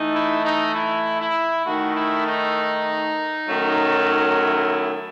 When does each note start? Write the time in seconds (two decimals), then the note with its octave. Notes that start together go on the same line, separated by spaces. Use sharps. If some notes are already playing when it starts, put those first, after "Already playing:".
Already playing: E3 A3 D#4
0.14 E4
0.44 D#4
0.75 E4
1.21 E4
1.66 D#3 A3 D#4 F#4
1.96 E4
2.27 D#4
3.48 D#3 F#3 A3 C#4
4.39 E4